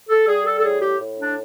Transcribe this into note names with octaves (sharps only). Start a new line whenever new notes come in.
A4
G3 G#4
A4
A4
A2 G#4
G4
A2
D4